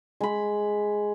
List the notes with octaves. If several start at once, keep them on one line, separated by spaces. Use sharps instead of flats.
G#3 B5